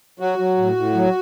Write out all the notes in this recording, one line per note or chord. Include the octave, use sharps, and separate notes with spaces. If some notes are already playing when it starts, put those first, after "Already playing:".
F#3 F#4
F#3
A2
A2
F#3